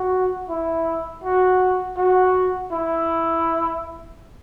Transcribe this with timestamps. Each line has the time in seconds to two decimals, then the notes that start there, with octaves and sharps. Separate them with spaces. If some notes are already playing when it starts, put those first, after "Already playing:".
Already playing: F#4
0.50 E4
1.24 F#4
1.97 F#4
2.72 E4